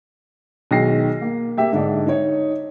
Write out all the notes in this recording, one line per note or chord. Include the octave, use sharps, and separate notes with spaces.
B1 D#3 G#3 G5 A#6 C7
A#3
A#3 G4 E5 G5
G#2 D3 D4 D#5
D#4 C#5 D#5